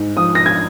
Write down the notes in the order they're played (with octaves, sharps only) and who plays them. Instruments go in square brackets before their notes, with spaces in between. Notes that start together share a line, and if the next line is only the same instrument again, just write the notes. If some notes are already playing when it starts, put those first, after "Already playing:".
Already playing: [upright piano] G#2
F3 D#6
A#6
G#6